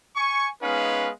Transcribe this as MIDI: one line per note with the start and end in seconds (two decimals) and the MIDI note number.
0.16 0.48 80
0.16 0.48 85
0.62 1.10 56
0.62 1.10 59
0.62 1.10 61
0.62 1.10 63
0.62 1.10 71
0.62 1.10 77